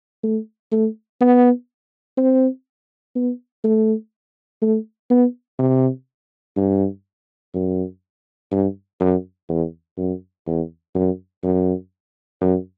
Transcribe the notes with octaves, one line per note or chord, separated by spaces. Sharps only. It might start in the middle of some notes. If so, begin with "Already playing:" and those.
A3
A3
B3
C4
B3
A3
A3
B3
C3
G2
F#2
G2
F#2
E2
F#2
E2
F#2
F#2
F#2